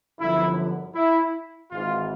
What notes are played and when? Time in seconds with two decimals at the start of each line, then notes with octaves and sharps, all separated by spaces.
0.19 G1 F#2 D3 F3 E4
0.95 E4
1.70 G#1 G#2 E3 F4